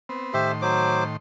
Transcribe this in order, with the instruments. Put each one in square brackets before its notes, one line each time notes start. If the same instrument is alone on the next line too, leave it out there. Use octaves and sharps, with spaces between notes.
[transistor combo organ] B3 C4
[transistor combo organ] A2 D#3 C6 [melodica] G4 C5 E5
[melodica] F#3 C5 D6